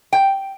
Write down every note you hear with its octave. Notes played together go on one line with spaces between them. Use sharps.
G5